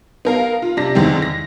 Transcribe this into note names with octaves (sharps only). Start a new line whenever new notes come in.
B3 A#4 F5
F4
C3 D4 A#6
E2 D3 D#3 G#3 C4
A#6